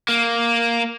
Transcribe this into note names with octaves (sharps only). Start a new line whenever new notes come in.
A#3